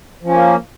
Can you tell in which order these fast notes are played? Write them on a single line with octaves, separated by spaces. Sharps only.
F3 C#4 A#3